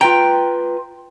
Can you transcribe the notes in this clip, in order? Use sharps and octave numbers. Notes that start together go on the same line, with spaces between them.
F4 B4 G5 A#5